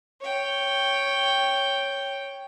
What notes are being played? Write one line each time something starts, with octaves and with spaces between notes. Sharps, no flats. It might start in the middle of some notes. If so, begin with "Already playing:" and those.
C#5 G5